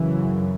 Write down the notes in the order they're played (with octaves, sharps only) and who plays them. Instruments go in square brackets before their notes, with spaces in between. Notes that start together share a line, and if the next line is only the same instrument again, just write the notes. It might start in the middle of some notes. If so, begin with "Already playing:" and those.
Already playing: [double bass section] F#2 C#3 E3